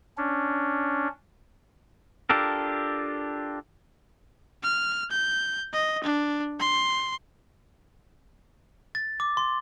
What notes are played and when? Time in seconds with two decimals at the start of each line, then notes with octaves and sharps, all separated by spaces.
0.18 C#4 D4
2.30 D4 F4 G4 A4 A#4
4.63 F6
5.10 G6
5.73 D#5
6.04 D4
6.60 C6
8.95 A6
9.20 D6
9.37 C6